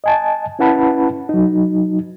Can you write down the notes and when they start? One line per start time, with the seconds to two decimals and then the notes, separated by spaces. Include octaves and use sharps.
0.04 D#5 G#5 A5
0.59 C#4 E4 B4 F#5 A5 B5
1.29 F#3 D#4